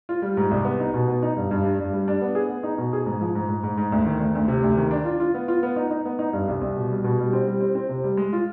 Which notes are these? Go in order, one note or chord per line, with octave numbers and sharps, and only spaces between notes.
F4
G3
G#2
C2
B3
D#4
B2
B3
D#4
G2
G2
D4
G2
G3
D4
B3
G#4
B3
D#4
B2
G#4
G#2
F3
G#2
G#2
G#2
G#2
D2
D#3
D2
D2
C3
D2
D#3
D4
F4
F4
B3
F4
B3
D#4
D#4
B3
D#4
G2
C2
C2
B2
G3
B2
G3
C4
G3
C4
C4
C3
G3
G#3
F4